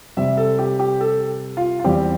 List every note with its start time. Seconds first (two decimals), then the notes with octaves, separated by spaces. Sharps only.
0.17 C3 G3 C4 E5
0.37 A4
0.59 G4
0.79 G4
1.01 A4
1.57 F4
1.80 F4
1.84 E2 E3 G3 C4 G4